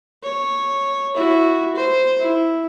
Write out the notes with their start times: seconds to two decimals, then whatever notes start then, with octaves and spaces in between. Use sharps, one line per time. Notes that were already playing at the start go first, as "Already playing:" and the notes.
0.23 C#5
1.15 E4 F#4
1.76 C5
2.20 E4